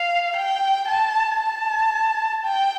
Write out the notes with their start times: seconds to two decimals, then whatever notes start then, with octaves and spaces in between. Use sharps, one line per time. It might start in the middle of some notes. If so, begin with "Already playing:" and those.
Already playing: F5
0.36 G5
0.88 A5
1.41 A5
2.45 G5